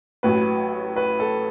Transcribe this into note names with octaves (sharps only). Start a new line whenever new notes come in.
A1 A2 F#3 B4
B4
A4